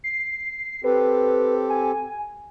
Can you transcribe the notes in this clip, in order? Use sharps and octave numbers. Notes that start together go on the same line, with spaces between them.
C7
C4 G4 A4 B4
G#5